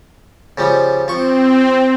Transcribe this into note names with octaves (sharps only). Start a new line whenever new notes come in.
C#3 F3 G3
F3 C4 C#6